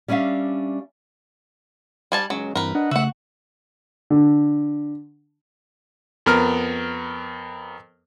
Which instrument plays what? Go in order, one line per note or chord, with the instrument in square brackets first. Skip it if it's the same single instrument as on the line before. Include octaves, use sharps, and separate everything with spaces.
[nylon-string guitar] G3 C#4 D4 E5 F5
[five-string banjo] G3 G#5 A5
[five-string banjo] F#3 [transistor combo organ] G#3 C#4
[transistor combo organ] G2 E3 C4 [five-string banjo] A#4 B4
[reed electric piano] D4 [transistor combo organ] D#5 F#5
[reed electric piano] C#3 A3 [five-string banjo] F#4 F#5 [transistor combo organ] E5 E6
[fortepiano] D3
[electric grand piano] F2 B3 A#4 F6